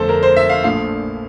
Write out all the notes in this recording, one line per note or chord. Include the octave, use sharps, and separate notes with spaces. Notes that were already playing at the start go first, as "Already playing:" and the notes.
Already playing: G1 F2 D3 A3 A4 C5
A#4
C5
E5
F5
A#1 A#2 F3 A3 F5